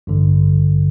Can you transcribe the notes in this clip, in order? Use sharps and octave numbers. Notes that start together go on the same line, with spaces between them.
A1 G2 D3